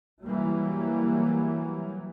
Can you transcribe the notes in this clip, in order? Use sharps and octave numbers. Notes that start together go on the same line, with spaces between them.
E3 F#3 G3 A#3